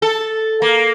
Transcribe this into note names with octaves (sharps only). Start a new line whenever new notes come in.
A4
A#3